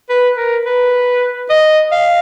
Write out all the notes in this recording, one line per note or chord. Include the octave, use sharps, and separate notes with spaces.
B4
A#4
B4
D#5
F5